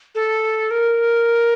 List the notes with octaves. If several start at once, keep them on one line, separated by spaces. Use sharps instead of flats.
A4
A#4